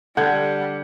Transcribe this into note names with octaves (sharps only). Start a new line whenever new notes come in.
D3 G3 F#5 G6 G#6